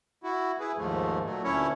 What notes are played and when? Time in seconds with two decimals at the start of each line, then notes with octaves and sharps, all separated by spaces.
0.23 E4 F#4
0.60 E4 G#4 B4
0.77 D#2 G#2 F3 A3
1.24 A#2 F#3 A3
1.44 D2 A#2 A3 C#4 E4 C#5